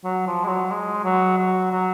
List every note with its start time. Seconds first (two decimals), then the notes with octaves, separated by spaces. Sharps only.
0.04 F#3
0.27 F3
0.44 G#3
0.48 F#3
0.71 G#3
1.04 F#3
1.38 F#3
1.72 F#3